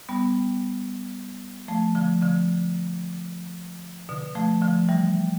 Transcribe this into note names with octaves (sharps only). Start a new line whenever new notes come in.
G3 B3
F3 A3
D3 F3
D3 F3
B2 D3
F3 A3
D3 F3
E3 G3